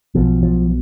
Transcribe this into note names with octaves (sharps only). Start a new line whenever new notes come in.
B1 B2 F3
F3